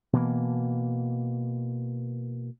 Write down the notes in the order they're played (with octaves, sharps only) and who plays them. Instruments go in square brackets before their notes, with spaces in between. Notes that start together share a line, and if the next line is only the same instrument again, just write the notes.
[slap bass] B2 E3 A#3